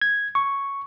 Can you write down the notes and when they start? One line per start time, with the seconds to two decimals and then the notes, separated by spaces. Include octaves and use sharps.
0.02 G#6
0.35 C#6